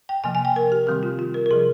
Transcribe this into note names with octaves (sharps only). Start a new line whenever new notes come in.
G5
C3 F3 A#3 G#5
G#5
G5
A#4
G4
C3 D#3 G3 C4 G4
F4
F4
A#4
A#4
C3 F3 G#4